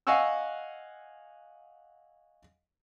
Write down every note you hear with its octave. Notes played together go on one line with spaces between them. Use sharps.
D#5 F5 F#5 G#5 C#6 E6